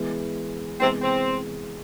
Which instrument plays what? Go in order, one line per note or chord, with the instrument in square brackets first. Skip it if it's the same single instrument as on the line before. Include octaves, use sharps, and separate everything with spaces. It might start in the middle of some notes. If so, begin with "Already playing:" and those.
Already playing: [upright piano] E3 G#3 B3
[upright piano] C3 E3 G#3 B3 [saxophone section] C4
[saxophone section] C4